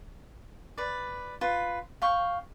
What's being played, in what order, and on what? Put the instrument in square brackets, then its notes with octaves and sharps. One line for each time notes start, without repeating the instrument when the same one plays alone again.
[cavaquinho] B4 D5
F4 B4
F5 G5 C#6